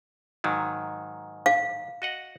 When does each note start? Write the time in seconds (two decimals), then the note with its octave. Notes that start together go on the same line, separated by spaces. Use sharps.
0.44 G#2 D#3 F#3
1.46 F5
2.02 F#4 D#5 F#5